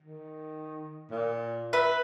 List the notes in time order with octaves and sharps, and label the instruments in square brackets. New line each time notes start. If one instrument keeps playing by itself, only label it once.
[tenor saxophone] D#3
A#2
[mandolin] B4 [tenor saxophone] E5